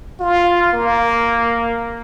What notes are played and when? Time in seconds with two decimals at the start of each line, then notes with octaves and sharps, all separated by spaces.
0.20 F4
0.73 A#3